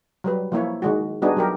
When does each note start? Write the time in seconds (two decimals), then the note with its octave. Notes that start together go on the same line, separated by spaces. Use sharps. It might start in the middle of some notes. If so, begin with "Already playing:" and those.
0.24 F#3 G3 B4
0.52 F3 A#3 E4 C#5
0.82 D#3 G#3 F#4
1.22 G3 B3 D4 D#4 F#4 G#4
1.37 F#3 G4 A#4